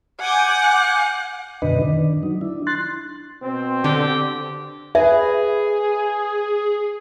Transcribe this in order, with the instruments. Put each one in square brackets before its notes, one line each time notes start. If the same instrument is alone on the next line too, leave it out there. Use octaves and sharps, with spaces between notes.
[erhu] F#5 [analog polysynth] G#5 D6 G6
[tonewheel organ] F#2 B2 D3 D4 B4 D#5
D#3 D4
F#3 D#4
D4 E4
C6 F#6 A6
[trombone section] B2 C4
[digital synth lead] D3 [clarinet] G4
[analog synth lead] G#4 [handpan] B4 [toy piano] E5